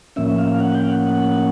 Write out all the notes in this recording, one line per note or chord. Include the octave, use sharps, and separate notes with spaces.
A2 F3 A#3 C#4 E5
E5
F5
F5
F#5
G5
F5
F#5